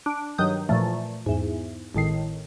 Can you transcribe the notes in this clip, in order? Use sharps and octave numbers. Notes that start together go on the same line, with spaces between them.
D4
G2 D#3 F#3 D#6 G6
A#2 E3 F3 A3
E2 G#2
G#1 A2 D#3 C7